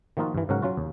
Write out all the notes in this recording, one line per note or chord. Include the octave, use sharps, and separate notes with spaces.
D#3 F3 A#3 D#4 F4 F#4
G2 E3
G#2 C#3 F#3 C#4 A#4 F#5
F#3 C#4 F4 F#4
D#2